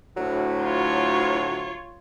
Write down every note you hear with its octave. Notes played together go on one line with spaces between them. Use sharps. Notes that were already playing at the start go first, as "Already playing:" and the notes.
D2 A2 F#3
F4 C#5